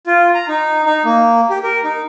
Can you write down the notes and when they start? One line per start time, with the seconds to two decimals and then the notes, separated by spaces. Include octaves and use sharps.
0.07 F4
0.35 A#5
0.48 D#4
0.85 D#4
1.05 A#3
1.50 G4
1.63 A#4
1.84 D#4